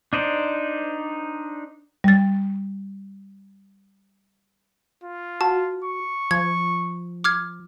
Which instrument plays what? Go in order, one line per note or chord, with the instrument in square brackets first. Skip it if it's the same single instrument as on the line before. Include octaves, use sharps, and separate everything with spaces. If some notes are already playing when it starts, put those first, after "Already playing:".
[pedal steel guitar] D4 D#4 C5 D5
[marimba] G3 A6
[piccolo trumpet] F4
[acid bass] F#4 [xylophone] A5
[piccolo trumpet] C#6
[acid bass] F3 [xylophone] G#6
[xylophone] D6 F6 G#6